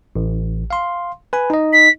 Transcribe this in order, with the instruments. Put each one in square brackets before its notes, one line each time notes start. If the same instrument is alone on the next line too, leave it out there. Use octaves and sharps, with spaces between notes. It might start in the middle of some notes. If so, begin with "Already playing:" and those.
[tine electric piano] A1
F5 C6
B4 G#5 B5
D#4 D#5
[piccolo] B6